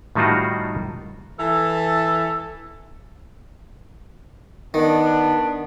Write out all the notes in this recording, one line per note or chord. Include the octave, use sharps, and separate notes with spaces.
A2 D#3 G3 D#4 F4 F#4
E3 A4
D#3 B3 D4